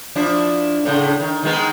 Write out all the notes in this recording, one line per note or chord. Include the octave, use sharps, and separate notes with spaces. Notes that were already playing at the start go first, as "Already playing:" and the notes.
F3 D4 E4
A2 C#3
D#3
D#3 G#3 B3